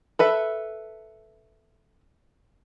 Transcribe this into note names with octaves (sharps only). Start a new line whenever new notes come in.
A4 B4 E5